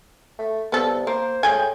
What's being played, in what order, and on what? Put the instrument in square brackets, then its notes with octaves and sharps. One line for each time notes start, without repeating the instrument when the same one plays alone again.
[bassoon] A3
[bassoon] C2 [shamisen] B3 A4
[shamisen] A#3 [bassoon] C5
[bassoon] A2 [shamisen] G#3 G5 G#5